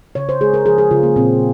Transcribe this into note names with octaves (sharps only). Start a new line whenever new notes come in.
C#3 C#5
C5
G#3 G#4
A#4
F3 G#4
G#4
C#3 F4
A#3
A#2 C4